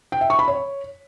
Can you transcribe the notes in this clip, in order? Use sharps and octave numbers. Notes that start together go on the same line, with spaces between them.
G5
E5
C#6
B5
C#5